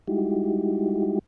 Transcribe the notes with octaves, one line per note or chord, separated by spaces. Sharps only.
G3 G#3 D#4 E4 F#4 G4